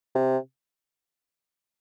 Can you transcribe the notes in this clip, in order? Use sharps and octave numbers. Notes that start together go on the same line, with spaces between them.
C3